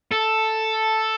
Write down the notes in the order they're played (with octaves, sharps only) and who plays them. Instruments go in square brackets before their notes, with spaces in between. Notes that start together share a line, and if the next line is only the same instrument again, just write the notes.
[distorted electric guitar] A4